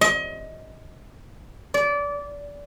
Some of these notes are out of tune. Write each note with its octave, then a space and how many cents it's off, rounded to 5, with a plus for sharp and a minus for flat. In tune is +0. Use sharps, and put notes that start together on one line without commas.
D#5 +30
D5 -25